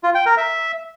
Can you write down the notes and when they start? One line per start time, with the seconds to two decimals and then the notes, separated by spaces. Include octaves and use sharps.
0.03 F4
0.15 G5
0.26 A#4
0.37 E5